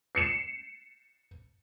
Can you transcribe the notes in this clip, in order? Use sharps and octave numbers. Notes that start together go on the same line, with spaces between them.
C7 C#7 E7